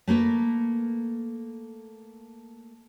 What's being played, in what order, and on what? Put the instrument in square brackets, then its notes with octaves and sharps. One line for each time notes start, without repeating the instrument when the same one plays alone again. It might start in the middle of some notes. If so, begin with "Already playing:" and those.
[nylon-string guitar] A3 A#3 A#4 B4